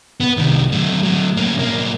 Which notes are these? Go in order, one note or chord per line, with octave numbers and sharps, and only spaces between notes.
B3 B4
C2 D#3
F#3 A3
F#3 A3
A#3 C#4
B1 A#3